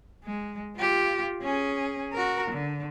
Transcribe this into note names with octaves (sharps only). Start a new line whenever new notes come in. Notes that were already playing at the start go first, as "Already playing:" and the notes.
G#3
F4 G4
C#4 G#4
F#4 A#4
D3